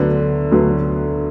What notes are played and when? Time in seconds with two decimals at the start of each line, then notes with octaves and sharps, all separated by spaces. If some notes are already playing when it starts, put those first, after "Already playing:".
Already playing: D2 D3 F#3 B3
0.51 D2 D3 F#3 B3